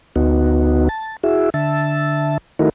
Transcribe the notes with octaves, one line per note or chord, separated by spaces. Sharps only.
D2 B3 D#4 F#4
A5
E4 F#4 G#4 E5
D3 E5 A5
D#3 A3 D#4 E4 F#4 A#4